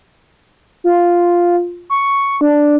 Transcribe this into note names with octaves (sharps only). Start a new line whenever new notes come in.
F4
C#6
D4